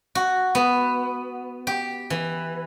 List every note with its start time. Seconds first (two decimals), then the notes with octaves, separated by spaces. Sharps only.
0.15 F#4
0.55 B3
1.67 G4
2.10 E3